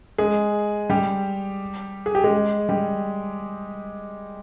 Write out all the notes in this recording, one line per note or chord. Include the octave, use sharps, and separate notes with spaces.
G#3 G#4
G3 G4
G#4
G4
G#3 G#4
G3 G4